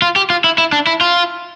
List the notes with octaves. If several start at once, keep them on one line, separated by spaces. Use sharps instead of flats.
F4
G4
F4
E4
E4
D4
E4
F4